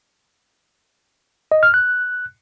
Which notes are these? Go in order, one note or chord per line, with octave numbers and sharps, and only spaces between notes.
D#5
F6
F#6